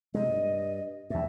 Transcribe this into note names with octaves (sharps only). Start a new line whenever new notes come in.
C3 G#3 D#5
G2
E2 G2 E5